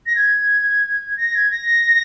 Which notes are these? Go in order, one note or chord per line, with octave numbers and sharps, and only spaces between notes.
A#6
G#6
A#6
G#6
A#6